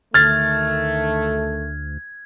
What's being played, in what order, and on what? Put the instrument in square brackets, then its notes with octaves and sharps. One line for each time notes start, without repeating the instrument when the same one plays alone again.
[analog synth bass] D2 [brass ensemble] D#3 A3 [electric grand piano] F6 A6 [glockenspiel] G#6